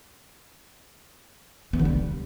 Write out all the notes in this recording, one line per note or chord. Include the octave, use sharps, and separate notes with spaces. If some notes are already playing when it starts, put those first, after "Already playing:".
B3
D3
G3